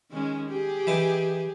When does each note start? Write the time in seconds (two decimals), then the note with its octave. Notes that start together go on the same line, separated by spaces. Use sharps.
0.11 D#3 G#3 C#4
0.49 G4 G#4
0.87 E3 D#4 D6